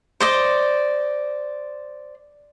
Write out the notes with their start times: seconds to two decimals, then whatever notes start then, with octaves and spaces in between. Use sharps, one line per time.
0.20 C5 D5 D#5